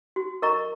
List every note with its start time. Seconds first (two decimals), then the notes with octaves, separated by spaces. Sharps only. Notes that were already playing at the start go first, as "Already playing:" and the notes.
0.16 F#4
0.42 A#4 D#5 A#5 C#6